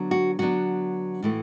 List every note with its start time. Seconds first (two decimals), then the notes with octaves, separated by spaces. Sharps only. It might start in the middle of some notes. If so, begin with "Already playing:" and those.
Already playing: D3 F#3 B3 D4
0.11 F#4
0.39 D3 F#3 B3 D4 F#4
1.23 A2 E3 A3